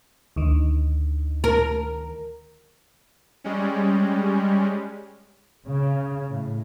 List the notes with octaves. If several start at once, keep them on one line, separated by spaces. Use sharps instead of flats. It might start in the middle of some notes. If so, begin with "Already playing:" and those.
D2 D#3
A#4
G3 G#3 C#4
C#3
A2